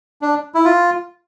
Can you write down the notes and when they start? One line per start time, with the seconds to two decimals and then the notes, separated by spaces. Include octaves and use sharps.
0.22 D4
0.54 E4
0.65 F4